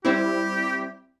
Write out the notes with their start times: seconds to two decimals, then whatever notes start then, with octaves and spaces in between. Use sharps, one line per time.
0.05 G3 C4 E4 G4